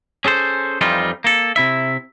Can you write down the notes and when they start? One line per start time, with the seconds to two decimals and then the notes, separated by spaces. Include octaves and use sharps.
0.25 C#4 G#4 A4 C5
0.81 F2 E3 G3 C4 D#4 F4
1.24 A#3 A4
1.56 C3 E4 E5